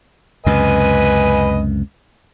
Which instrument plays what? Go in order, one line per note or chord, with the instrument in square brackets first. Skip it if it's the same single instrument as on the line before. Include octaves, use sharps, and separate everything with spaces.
[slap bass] C#2 F#2 C3 [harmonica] B4 D#5 G#5